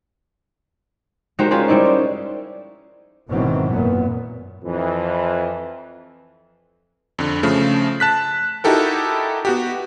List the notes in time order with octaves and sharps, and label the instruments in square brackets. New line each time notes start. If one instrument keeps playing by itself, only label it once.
[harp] G#3 D#4 F#4 G4 A#4 C5
C#4 F4 G4 G#4 C5
G3 D#4 E4 D5 D#5
C#4
[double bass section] G#1 B2 D#3 E3 F#3 C4
F#2 A#2 B3
[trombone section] F2 E3
[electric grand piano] F2 D3
C#3 F3 A3
A5 F#6 B6
D#4 E4 F#4 G4 A4 A#4
B3 F#4 G4